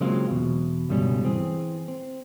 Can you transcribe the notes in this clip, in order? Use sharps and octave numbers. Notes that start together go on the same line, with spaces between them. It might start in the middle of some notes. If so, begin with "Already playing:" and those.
C#3 F#3 G#3 A#3 C4 F4
E2 B2
C#2 G2 B2 D3 G3 C#4
E3 C4 G#4
C4